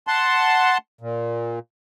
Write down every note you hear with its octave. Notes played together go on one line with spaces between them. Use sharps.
F#5 A5 C6
A#2